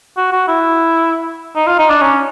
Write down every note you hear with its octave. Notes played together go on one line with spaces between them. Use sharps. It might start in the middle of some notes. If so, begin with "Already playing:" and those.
F#4
F#4
E4
D#4
F4
D#4
D4
C#4